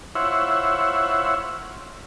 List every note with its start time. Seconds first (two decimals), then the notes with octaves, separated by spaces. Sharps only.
0.15 E4 F4 C5 C#5 E5 F#5